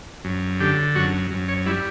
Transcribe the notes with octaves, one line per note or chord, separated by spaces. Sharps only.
F#2
D3 G4
F#2 F#4
F#2
C#5
G3 E4